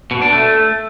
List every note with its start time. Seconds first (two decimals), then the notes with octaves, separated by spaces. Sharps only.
0.11 B2
0.22 D4
0.32 A3